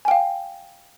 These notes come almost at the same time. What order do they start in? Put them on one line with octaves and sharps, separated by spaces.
G#5 G5 F5